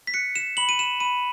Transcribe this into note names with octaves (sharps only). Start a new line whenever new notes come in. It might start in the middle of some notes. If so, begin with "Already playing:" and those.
B6
F#6 C#7
E7
B5 F#7
D#7
E7
B5 D#7